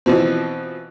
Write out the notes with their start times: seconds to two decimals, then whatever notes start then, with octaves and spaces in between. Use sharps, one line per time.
0.06 B2 E3 F3 C4